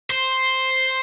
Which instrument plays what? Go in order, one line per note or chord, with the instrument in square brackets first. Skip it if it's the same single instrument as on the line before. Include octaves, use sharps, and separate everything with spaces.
[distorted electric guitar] C5